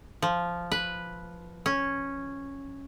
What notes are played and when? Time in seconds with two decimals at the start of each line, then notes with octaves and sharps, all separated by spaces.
0.22 F3
0.72 B4
1.66 C#4